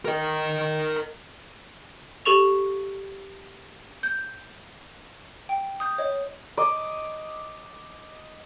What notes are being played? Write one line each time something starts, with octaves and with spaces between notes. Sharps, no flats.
A#4 D#5
G4 A4 C#6 F7
G6
G5
D#6 G6
C#5 D#5
D#5 D6